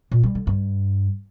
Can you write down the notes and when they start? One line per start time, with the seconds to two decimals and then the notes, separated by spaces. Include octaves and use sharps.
0.12 A#2
0.23 G3
0.35 D3
0.47 G2